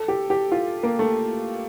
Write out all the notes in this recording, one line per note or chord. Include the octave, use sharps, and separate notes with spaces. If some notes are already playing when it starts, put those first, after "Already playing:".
Already playing: A4
G4
G4
F4
A#3
A3